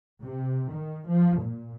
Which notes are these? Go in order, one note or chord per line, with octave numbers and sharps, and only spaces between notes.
C3
D#3
F3
A#2